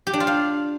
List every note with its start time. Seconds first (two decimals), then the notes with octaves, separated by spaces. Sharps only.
0.07 G4
0.13 D4
0.20 F4
0.27 F5